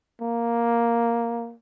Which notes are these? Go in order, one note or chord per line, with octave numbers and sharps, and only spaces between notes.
A#3